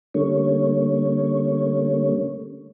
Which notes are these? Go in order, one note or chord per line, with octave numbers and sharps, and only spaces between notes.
D3 G3 A3 A#3 C#4 C#5